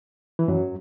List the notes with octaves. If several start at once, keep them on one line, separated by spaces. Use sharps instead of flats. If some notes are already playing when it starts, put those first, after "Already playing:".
E3
F#2 F#3